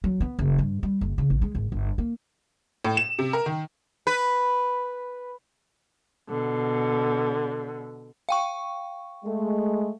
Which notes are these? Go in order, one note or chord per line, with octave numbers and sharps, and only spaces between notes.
F#3
B3
F#1
G2
G3
F#1
C#3
A1
G#3
G#1
G1
A#3
A2
E7
C3
A#4
D#3
B4
B2 D3
F5 G5 C#6
G#3 A3